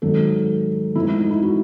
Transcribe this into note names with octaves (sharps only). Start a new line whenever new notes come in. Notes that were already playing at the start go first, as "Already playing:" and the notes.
G#2 D#3 F#3 A4
G#2 E3 A3 E4
E4
D#4
E4
F#4